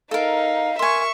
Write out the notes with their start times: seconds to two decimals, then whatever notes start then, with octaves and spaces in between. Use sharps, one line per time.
0.11 D#4 A4 A#4 F5
0.79 A#4 E5 G#5 C6 C#6